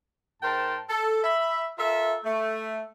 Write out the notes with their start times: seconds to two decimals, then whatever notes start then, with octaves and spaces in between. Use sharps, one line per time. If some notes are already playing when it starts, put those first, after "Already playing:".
0.42 G#2 A#4 C5 G5 A5
0.89 A4
1.24 E5 B5
1.79 F4 A4 A#4 E5
2.24 A3